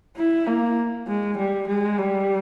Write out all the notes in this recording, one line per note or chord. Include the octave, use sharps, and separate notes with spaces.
E4
A#3
G#3
G3
G#3
G3